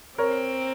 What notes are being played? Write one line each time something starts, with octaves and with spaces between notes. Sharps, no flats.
C4 A#4 C#5